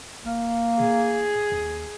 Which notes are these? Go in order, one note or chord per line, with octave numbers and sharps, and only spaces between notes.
D#1 A#3
A2 G#4
D#2